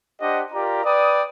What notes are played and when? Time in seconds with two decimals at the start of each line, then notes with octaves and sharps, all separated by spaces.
0.21 D4 G4 C5 D#5 F#5
0.53 F4 G4 A#4 D5 A#5
0.85 B4 D5 G5 D#6